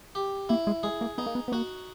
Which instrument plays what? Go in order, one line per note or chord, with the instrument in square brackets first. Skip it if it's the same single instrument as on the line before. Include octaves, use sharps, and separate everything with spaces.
[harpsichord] G4
[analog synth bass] A#3 [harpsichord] E4
[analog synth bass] G#3
[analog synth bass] G#3 [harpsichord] G#4
[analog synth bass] A#3
[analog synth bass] B3 [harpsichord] D#4
[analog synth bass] A#3
B3
B3
[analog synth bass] A#3 [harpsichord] F#4